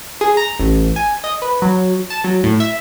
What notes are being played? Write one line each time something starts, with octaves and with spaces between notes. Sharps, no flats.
G#4
A#5
A1
G#5
D#5
B4
F#3
A5
F#3
A2
E5